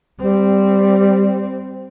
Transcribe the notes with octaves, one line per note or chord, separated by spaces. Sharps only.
G3 C4